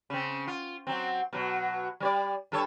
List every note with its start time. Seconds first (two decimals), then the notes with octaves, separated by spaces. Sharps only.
0.10 C#3 C4
0.47 F4
0.87 F#3 C4
1.33 B2 F#3
2.00 G3 C#5 D5
2.52 G2 A4 C#5